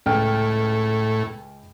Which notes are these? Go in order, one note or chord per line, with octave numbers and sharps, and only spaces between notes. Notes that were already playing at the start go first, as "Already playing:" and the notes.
C#2 A2 G5 F6